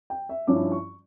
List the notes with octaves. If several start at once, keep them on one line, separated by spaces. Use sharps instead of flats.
G5
E5
G2 F3 C#4 E4 D6
C#6